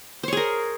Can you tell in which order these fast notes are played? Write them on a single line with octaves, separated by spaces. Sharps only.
C5 C#5 G#4 A#4